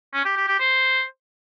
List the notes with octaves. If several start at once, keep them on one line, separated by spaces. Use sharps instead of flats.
C#4
G4
G4
G4
C5